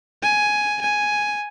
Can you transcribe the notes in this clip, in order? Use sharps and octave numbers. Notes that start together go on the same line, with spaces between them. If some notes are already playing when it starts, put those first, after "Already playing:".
G#5
G#5